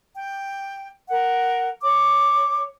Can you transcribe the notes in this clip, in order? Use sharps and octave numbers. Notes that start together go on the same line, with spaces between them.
G5
A#4 F#5
C#5 D6